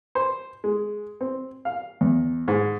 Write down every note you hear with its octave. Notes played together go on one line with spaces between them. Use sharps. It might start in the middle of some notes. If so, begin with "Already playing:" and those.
C5
G#3
C4
F5
E2
G#2